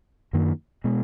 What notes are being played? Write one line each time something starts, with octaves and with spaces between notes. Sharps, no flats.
F#2 D#3 A#3
B2 G#3